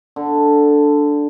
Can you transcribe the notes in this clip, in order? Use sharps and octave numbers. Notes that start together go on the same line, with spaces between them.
D3